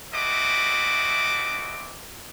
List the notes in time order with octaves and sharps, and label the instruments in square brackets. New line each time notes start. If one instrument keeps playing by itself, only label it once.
[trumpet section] A3 C4 E4 F#4 D#5 D6